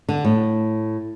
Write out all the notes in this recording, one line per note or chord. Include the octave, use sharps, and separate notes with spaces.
D3
A2